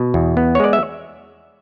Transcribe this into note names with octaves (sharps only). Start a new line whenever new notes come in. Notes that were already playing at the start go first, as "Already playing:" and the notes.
Already playing: B2
E2
B3
C#5
G#3 D5
E5